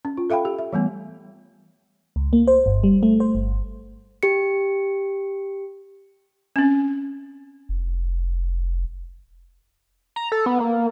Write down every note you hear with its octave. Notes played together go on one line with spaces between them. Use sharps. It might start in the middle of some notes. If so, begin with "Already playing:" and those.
C#4
F4
A4 E5 F5 G5 B5
G4
E5
E3 G3 A3 B3
C#2
A#3
C5
G1
G3
A3
C5
G1
G4 C#7
C4 C#4
F1
A#5
A4
B3
A#3